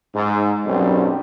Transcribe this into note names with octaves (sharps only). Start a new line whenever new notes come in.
G#2
B1 F#2 G3 C4